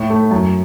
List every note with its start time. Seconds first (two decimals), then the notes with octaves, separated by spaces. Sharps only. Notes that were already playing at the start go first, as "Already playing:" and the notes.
Already playing: A2
0.10 A3
0.31 F#2